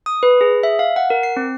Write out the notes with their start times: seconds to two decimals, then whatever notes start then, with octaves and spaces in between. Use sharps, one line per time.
0.06 D#6
0.23 B4
0.41 G#4
0.63 E5
0.79 F5
0.96 F#5
1.10 A#4
1.23 C7
1.37 C4